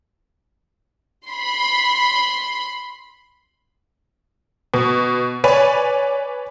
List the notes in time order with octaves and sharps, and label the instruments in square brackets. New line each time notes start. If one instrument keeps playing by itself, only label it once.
[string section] B5 C6
[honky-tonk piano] B2
B4 C#5 D5 G#5